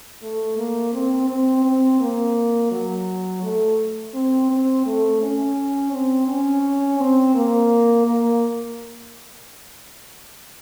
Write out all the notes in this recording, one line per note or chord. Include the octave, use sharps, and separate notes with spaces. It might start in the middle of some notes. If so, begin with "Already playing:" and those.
A3
A#3
C4
C4
C4
A#3
F#3
A3
C4
C4
A3
C#4
C4
C#4
C4
A#3
A#3